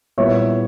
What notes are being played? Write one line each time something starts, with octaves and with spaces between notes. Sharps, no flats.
A#2 G3 B3 E4 C#5 E5